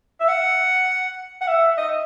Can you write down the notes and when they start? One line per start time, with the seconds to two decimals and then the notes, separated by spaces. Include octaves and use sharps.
0.20 E5
0.28 F#5
1.41 F#5
1.47 E5
1.78 D#5